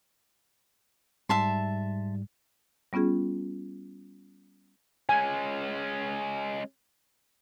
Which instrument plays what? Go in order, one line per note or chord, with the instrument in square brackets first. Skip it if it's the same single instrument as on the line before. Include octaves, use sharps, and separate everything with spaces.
[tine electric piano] G#2 G3 [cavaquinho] E5 A5 C6
[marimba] G3 B3 C#4 F4 G#4
[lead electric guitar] G#3 C#4 [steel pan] G#5